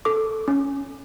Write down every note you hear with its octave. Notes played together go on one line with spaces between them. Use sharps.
A4 D6
C#4